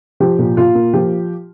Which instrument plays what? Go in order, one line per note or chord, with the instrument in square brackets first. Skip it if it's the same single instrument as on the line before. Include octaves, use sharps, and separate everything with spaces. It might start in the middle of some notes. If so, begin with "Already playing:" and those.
[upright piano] F3 G4
A#2
A#2 F4
A#3
F3 G4